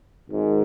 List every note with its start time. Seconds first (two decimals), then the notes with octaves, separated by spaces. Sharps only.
0.30 G#1 G#2